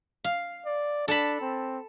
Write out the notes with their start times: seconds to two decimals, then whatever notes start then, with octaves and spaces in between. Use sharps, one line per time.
0.24 F5
0.66 D5
1.08 D4 A4 A5 B5
1.41 C4